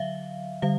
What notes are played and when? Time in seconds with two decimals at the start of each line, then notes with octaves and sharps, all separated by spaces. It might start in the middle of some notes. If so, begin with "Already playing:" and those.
Already playing: D3 F#3 E5 F5
0.62 D3 G3 F5